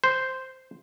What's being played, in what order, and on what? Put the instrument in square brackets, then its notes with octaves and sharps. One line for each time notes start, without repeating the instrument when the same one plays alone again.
[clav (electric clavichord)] C5